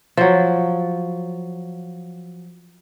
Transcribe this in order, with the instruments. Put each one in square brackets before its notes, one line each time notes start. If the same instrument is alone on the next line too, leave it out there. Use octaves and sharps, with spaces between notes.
[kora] F3 F#3